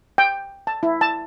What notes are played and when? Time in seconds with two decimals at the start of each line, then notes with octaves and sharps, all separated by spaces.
0.18 G5
0.67 A5
0.83 E4
1.01 A5